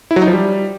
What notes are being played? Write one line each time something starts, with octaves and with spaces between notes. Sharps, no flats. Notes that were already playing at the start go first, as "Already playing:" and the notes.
E4
F#3
D#4
F3
G3